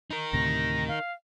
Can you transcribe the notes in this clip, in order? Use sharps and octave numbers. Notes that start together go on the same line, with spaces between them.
D#4 A#4
D2 A2 C3 A#6
F5